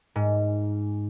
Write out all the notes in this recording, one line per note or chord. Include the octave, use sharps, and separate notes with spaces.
G#2